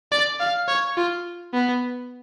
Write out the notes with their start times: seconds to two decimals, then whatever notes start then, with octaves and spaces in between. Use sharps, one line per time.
0.12 D5
0.40 F5
0.68 C#5
0.97 F4
1.53 B3